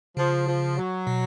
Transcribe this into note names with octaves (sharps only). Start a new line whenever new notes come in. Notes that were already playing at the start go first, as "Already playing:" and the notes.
C#3 F3
F3
F#3
B2